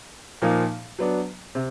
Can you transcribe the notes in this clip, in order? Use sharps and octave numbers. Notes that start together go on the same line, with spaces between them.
A#2 F3 A#3 D#4
F#3 B3 D4
C3